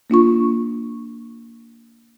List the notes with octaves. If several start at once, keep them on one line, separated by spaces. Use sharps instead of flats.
A#3 D4 F4 C#6